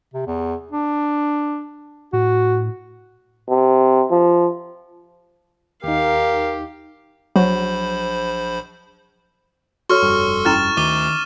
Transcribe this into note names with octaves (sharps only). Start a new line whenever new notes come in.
C3
E2
D4
A2 F#4
C3
F3
D#2 D#4 G4 A#4 F5
A#1 F#3 C5 B5
F#4 A4 C#5 C6 C#6 F6
F1 G2
C#4 E4 G5 F6 A6 E7
D2 D#3 D6 D#7 G7